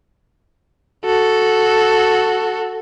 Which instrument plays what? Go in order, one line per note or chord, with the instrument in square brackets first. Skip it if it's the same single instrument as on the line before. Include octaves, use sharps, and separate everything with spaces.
[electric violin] F#4 A4